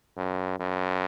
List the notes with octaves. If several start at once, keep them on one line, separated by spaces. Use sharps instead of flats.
F#2
F#2